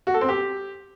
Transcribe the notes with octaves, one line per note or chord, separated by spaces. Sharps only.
F#4
A4
C4
G4